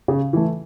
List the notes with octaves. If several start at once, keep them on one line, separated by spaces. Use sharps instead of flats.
C#3
E3 A3